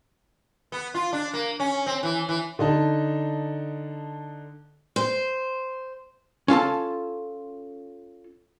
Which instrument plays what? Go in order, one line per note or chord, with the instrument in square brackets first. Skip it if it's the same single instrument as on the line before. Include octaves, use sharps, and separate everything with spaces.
[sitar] B3
F4
D4
A#3
C#4
C4
E3
E3
[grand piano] D3 D#4 A5
[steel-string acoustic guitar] C5
[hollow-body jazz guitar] C#4 F4 A4 A5